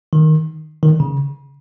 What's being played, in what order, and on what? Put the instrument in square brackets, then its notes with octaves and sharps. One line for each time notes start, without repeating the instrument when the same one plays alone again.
[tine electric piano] D#3
D#3
C#3